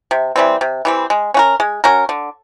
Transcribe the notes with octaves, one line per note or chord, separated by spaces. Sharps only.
C3
E3 G3 C4
C3
E3 G3 C4
G#3
C#4 F#4 A#4
G#3
C#4 F#4 A#4
D3